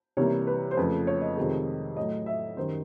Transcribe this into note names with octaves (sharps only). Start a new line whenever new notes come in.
C3 E3 G3 A#3 C#5
B4
C5
F2 C#3 F3 A3 B4
C#5
D#5
F2 C3 D#3 G#3
A2 F#3 A3 D#5
E5
F#2 D#3 G3 C5